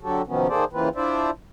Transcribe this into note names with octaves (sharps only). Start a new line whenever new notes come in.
D3 F#3 F#4 G4 A4
C3 D#3 F3 F#3 B3 C#4
D#3 A#3 G#4 A4 C5 D5
C#3 E3 A#3 C4 F4 B4
D4 E4 F4 C5 D5 E5